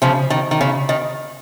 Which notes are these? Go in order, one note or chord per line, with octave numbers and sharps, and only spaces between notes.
C#3 F3
D#3
D#3
C#3
D#3